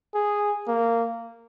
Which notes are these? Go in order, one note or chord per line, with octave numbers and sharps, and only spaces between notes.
G#4
A#3